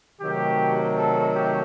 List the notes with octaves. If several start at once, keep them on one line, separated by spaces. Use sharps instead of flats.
C3 D#3 F#3 A3 G4
A4
G4